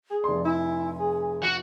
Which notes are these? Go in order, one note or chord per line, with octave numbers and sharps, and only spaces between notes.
G#4
F1 D5 C6
E4 G#5
G#4
F#4 F#5